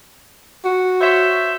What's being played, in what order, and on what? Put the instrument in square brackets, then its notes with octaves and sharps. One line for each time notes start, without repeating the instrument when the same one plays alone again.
[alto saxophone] F#4
[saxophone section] C5 C#5 E5